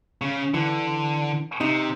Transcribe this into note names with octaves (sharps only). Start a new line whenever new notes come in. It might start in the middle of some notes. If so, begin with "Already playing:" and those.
C#3
D3 E3
C3 D#4